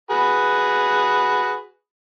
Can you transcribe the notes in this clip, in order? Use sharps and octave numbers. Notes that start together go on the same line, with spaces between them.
F#4 G#4 B4